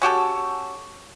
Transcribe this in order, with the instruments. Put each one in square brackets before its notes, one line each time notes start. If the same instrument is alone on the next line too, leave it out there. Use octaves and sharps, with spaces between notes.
[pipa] C#4 F#4 G4 A4